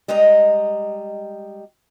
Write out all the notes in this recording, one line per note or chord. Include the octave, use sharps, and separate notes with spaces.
G3 G#3 D#5 G5 A#5